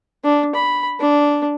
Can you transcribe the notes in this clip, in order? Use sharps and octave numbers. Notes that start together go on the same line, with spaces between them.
D4
B5
D4